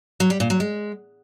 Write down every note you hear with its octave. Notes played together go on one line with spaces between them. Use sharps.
F#3
G3
A#2
F#3
G#3